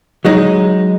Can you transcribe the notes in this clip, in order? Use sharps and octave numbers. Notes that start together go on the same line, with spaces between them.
F#3 G#3 D#4